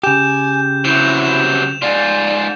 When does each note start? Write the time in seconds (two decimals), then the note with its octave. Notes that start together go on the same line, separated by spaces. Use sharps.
0.04 C#3 G4 G#5 G6 E7
0.85 C3 F#3 E4 G6 E7 F7
1.25 E7
1.82 G#2 F4 D5